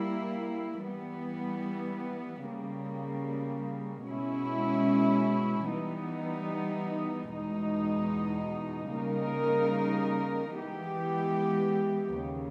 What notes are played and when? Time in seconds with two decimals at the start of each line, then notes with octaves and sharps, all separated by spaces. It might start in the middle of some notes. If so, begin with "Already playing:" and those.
Already playing: G3 A#3 E4
0.86 E3 G3 B3
2.47 C#3 G3 A#3
4.09 B2 G#3 C#4 E4
5.71 E3 G3 B3 D#4
7.33 E2 B2 G#3 D#4
8.94 C#3 G3 A#3 D#4 A#4
10.56 E3 G#3 B3 G4
12.18 D#2 C#3